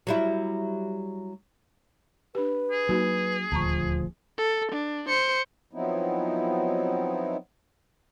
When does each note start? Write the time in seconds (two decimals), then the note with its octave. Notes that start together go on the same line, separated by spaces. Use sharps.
0.07 F#3 G3 E4
2.35 D4 G4 B4
2.71 G#4
2.89 F#3 A#3 D#4 F#4
3.52 D#1 D2 F3 A5 A#5 C#6
4.38 A4
4.72 D4
5.08 C5 C#7
5.73 F3 F#3 B3 C4 D#4 E4